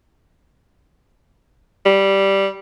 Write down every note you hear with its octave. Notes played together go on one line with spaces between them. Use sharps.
G3